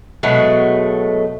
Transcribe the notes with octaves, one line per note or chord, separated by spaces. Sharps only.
B2 F#3 G#3 A3